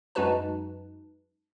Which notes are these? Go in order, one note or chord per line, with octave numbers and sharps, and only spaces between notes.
F#2 G#3 D#4 F#4 B4 A5